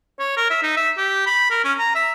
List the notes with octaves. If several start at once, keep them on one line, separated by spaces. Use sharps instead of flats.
C#5
A#4
E5
D#4
E5
G4
B5
A#4
C#4
A#5
E5